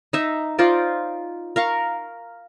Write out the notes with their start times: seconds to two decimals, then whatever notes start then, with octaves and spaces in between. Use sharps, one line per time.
0.13 D#4 E5
0.59 D#4 F4 C5 D5
1.56 A#4 F5 C#6